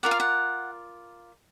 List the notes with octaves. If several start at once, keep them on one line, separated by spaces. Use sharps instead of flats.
F4 A#4 D5 F#5
F5
F#5